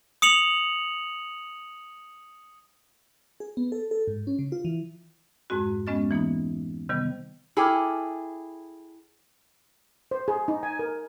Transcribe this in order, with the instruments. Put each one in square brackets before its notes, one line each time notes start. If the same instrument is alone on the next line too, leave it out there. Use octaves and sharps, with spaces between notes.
[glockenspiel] D#6 C#7 F7 F#7
[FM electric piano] G#4
B3
A4
A4
G#2
C#4
C#3
F4
E3
[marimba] F2 G#2 G#3 C4 F#4
G#3 B3 C#4 D#5 F6 A6
E3 A#3 B3 D#4
C3 D#3 G3 B3
[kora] E4 G#4 A4 [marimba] G5 D6 F6
[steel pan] C5
G#4
D#4
G#5
A#4